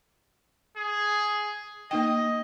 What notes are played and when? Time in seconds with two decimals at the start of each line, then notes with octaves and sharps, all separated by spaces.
0.76 G#4
1.91 A#3 D#4 D#5 G5